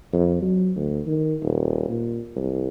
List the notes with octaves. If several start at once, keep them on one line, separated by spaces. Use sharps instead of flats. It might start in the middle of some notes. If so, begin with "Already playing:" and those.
F2
F#3
D2
D#3
D#1
A#2
C2